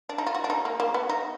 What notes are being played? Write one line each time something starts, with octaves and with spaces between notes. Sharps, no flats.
D4
D#4
F4
F#4
D4
D#4
A#3
A#3
B3
D#4